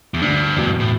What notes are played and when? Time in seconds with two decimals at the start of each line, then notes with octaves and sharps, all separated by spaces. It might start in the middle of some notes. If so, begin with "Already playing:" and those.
0.14 E2
0.21 D2 G2 D3 A3 D4
0.56 E2 B2 A3
0.80 A2